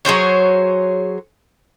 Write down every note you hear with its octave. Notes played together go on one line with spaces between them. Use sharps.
F#3 G#4 C5 C#5